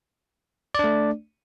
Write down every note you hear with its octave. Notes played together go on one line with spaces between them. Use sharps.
A3 D4 D5